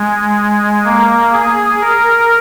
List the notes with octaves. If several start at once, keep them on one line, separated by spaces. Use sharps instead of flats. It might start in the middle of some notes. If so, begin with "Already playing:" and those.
Already playing: G#3
A#3
G#4
A#4